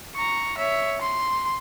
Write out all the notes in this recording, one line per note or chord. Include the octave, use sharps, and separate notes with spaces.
A#5 C#6
C#5 E5
C6